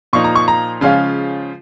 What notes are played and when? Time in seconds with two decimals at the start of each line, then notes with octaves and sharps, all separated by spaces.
0.13 A#2 F3 A#3 D#4 C#6
0.24 A#5
0.35 C#6
0.48 A#5
0.81 C#3 F3 G#3 C#4 F4 F5